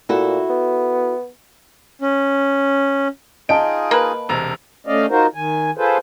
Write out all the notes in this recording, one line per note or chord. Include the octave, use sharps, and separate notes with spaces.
A#2 E4 F#4 A4
B3
C#4
D#4 F4 G#4 D#5 G5 A5 D7
A#3 B4
E1 C3 A#5
A3 C#4 D5 D#5 F5
D#4 F4 F#4 A#4 C5
D#3 G#5
F4 G#4 A4 B4 C5